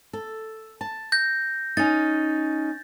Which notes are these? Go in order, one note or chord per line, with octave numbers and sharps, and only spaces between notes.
A4
A5
G6 A#6
C#4 D#4 A6